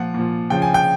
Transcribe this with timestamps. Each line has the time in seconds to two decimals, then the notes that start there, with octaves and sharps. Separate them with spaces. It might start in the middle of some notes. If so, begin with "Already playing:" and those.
Already playing: A#2 F3 F#5
0.14 A#2 F3
0.50 C#3 F3 G5
0.62 G#5
0.74 G5